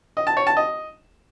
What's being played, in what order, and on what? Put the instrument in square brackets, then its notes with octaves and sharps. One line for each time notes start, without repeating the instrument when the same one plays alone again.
[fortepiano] D#5
A5
C#5
A5
D#5